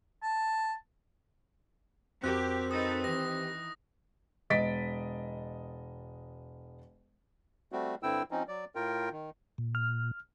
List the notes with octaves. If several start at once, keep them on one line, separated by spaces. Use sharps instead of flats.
A5
F2 C4 F#4 G4 A#4 F#6
D#4 A4 B4 D#6
D#3 E3 G4 A#6
E1 D#5 A6 B6 D7
G3 A3 C4 F#4
G2 D3 C4 E4 G5 E6
F3 C4 C#4 D#4
F#3 D5
A2 F4 A#4 G5
D#3
A#2
F6